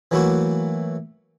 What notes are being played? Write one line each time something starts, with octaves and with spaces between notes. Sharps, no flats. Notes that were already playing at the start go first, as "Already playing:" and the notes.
E3 F#3 A3 A#3 E4 F#4